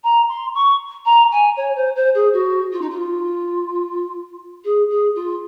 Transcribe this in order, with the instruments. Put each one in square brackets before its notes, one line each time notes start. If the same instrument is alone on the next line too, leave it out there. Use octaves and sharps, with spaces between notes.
[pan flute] A#5
C6
C#6
A#5
G#5
C#5
C5
C5
G#4
F#4
F4
D#4
F4
G#4
G#4
F4